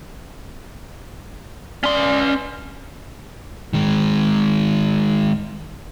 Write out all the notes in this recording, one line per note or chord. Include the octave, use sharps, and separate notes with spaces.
C#4 D5 C6
D#3 G#3